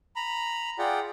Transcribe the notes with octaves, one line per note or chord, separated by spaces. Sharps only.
A#5 B5
F4 G#4 D5 F#5 G5